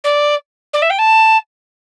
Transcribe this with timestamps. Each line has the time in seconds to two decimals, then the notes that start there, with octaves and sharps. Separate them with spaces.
0.04 D5
0.73 D5
0.82 E5
0.90 G5
0.98 A5